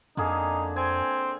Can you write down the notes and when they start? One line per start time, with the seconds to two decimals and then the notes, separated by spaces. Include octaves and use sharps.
0.17 F2 D3 A#3 D#4 G#4
0.76 C4 G#5